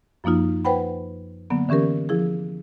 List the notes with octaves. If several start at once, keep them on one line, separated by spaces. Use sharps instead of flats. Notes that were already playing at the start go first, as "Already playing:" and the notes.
F#2 F3 A#3 D#4 F4
B4 C5 F#5 G5 B5
D3 F#3 A#3 B3
D3 E3 C#4 G4 A#4
F3 E4 G#4